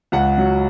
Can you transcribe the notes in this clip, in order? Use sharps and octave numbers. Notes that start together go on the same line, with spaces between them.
C#2 F#5
F#3